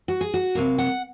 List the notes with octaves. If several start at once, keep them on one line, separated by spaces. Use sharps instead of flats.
F#4
G#4
F#4
C3 F#3 A#3 F5
F#5